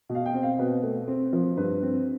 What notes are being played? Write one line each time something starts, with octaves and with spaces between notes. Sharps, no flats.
B2
F5
G5
C4
F5
B2 B4
A3
C4
F3
G2 B4
C4